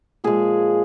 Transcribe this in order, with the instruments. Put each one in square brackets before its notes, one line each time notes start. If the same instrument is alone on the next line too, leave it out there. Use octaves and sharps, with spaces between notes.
[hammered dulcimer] A#2 F3 G#3 G#4